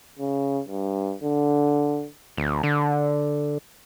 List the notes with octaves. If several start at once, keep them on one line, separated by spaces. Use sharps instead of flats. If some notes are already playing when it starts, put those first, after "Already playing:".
C#3
G2
D3
D2
D3